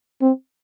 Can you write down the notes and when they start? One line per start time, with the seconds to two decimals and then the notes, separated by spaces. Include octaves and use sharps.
0.21 C4